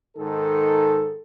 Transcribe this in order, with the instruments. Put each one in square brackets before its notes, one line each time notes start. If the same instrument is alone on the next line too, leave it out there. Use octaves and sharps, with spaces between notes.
[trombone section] G#2 D#3 A4